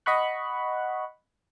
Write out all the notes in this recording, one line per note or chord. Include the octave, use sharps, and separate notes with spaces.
D#5 F#5 B5 C#6 F#6